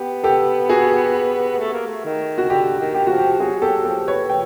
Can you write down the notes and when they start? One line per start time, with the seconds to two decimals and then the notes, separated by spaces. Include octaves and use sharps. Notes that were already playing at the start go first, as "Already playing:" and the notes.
Already playing: B3 G4
0.24 G4 A4
0.69 F#4 G#4
1.59 A3
1.73 A#3
1.87 A3
2.05 D#3
2.38 F#4
2.49 D3 G4
2.80 D#3
2.95 G4
3.07 F3 F#4
3.18 G4
3.40 F#3 F#4 G#4
3.62 F#3 G4 A4
3.84 F3 G4 A4
4.07 B4 C#5
4.29 F3 G5